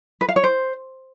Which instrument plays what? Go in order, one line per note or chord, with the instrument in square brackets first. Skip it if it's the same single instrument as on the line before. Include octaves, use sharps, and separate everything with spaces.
[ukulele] B4
F5
C#5
C5